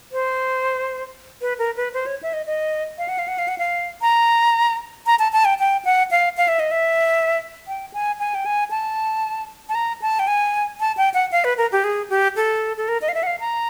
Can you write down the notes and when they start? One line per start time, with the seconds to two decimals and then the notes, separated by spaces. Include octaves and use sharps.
0.12 C5
1.41 B4
1.59 A#4
1.77 B4
1.94 C5
2.06 C#5
2.23 E5
2.33 D#5
2.46 D#5
2.98 F5
3.08 F#5
3.19 F5
3.28 F#5
3.38 F5
3.48 F#5
3.58 F5
4.02 A#5
5.06 A#5
5.19 A5
5.32 A5
5.45 G5
5.59 G5
5.85 F#5
6.11 F5
6.37 F5
6.48 E5
6.59 D#5
6.71 E5
7.68 G5
7.94 G#5
8.19 G#5
8.35 G5
8.46 G#5
8.71 A5
9.69 A5
9.75 A#5
10.02 A5
10.19 G5
10.27 G#5
10.80 A5
10.97 G5
11.14 F#5
11.32 F5
11.44 B4
11.57 A#4
11.72 G4
11.84 G#4
12.10 G4
12.36 A4
12.77 A4
12.89 A#4
13.02 D#5
13.09 F5
13.14 E5
13.23 F#5
13.27 F5
13.40 A#5